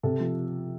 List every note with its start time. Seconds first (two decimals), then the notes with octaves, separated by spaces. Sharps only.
0.03 C3 A4
0.20 F3